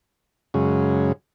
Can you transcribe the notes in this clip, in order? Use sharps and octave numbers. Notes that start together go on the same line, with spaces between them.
F#2 C#3 G#3